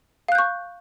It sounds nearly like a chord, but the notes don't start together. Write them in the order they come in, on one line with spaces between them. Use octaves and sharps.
F5 F#6 G6 C#6